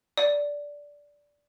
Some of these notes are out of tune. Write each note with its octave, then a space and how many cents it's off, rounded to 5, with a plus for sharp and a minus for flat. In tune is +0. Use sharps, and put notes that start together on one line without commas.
D5 -10